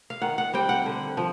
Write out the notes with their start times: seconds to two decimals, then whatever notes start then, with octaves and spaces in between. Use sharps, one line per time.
0.10 F5
0.22 D#3 F#5
0.38 F#5
0.54 G3 C4 G5
0.69 F#5
0.86 D3
1.17 F3